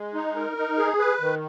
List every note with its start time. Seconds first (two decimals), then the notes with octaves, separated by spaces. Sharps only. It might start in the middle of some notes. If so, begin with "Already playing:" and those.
Already playing: G#3
0.14 D#4
0.36 A#4
0.57 D#4
0.78 G#4
0.99 B4
1.20 D#3